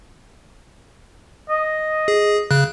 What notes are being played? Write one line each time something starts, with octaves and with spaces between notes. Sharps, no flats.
D#5
G#4
C#3 F#6